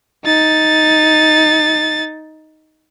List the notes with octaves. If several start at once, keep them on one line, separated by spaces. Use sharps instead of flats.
D#4 A6